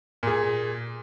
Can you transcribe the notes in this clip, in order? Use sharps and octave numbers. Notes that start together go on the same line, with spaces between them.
A#2 G#4